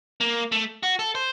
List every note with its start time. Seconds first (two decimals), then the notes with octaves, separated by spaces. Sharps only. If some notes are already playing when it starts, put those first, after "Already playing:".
0.21 A#3
0.52 A3
0.83 F#4
0.99 A4
1.15 C5